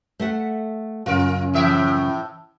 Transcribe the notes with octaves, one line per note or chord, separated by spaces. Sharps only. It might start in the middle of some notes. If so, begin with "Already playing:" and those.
A3 E5 F#5
F#2 C#3 F4 A#4
A2 E3 E5